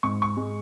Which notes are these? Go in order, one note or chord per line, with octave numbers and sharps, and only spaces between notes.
G#2 C#6
C#6
G#3